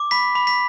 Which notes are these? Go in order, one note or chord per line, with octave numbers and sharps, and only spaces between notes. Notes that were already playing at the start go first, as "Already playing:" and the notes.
Already playing: D6
B5 B6
B5
B6